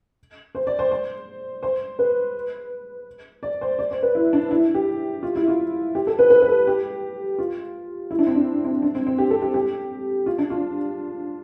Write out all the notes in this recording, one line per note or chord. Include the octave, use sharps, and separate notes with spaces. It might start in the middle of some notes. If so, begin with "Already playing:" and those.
C5
D5
C5
C5
C5
B4
D5
C5
D5
C5
B4
E4
D4
E4
G4
F4
E4
F4
G4
A4
B4
B4
B4
A4
G4
F4
E4
D4
C4
D4
C4
D4
C4
C4
G4
A4
G4
G4
F4
D4
F4